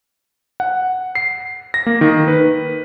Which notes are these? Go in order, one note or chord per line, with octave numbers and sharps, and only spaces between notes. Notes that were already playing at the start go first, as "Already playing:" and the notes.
F#5
C7
A#6
A#3
D#3
B4